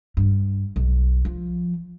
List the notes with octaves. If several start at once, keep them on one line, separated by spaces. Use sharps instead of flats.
G2
B1
F3